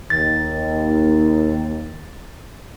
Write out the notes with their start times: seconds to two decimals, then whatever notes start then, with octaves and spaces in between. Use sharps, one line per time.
0.10 D#2 A6